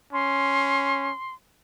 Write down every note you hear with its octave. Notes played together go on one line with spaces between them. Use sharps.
C#4 C6